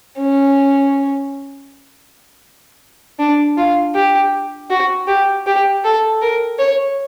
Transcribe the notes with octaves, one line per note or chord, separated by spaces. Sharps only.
C#4
D4
F4
G4
F#4
G4
G4
A4
A#4
C#5